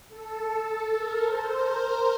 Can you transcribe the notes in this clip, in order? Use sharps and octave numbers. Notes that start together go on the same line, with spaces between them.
A4
A4
A#4
C5
A#4